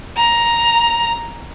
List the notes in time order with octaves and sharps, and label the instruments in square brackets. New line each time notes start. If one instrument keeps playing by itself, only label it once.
[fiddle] A#5